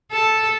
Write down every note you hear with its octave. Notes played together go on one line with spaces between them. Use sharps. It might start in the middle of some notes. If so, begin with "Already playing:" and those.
A4